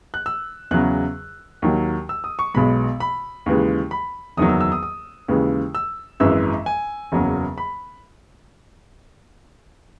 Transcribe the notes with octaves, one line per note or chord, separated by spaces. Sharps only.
F#6
E6
E2 C#3 F#3 F#6
D#2 D#3 F#3
E6
D#6
C#6
B1 B2 G#3 B5
B5
D#2 C#3 E3 G#3
B5
F#1 E2 D#3 F#3 D#6
E6
E6
D#6
D#6
D#2 C#3 E3 G#3
E6
G#1 F#2 E3 G#3 E6
G#5
F#1 E2 C#3 F#3
B5